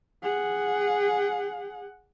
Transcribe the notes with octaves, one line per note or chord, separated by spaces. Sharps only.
G#4 F#5